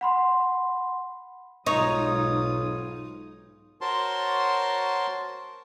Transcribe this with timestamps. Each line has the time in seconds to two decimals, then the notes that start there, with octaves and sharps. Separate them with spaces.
0.01 F#5 B5 C6
1.66 B1 G#2 D#4 F4 C#5 D#6
3.81 F#4 A#4 C5 C#5 A5 C6